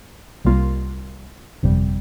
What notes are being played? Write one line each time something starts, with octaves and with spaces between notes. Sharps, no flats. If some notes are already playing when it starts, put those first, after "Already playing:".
C2 C3 G3 A#3 F4
G1 F2 C3 G3